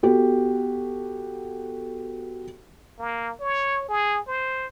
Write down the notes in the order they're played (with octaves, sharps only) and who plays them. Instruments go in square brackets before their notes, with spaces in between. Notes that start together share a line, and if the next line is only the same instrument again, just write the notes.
[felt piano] B3 F#4 G4 A4
[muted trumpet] A#3
C#5
G#4
C5